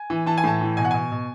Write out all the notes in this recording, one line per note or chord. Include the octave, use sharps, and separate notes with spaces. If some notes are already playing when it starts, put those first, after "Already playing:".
Already playing: G#5
E3
E3 A5
G#5
A2 A5
E3
B2 G#5
F#5
B2 G#5
B2